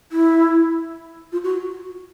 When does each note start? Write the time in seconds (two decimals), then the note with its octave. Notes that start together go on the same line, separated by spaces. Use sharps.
0.12 E4
1.32 F4
1.44 F#4